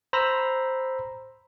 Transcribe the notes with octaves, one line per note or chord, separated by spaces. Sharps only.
C5 A#5 B5 E6 A#6